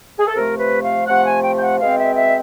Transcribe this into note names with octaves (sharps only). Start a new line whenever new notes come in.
G#4
A4
C3 F3 A3 A#4
B4
F5
C3 F3 A3 F#5
G#5
G5
G5
F#5
B2 G#3 C4 F5
E5
E5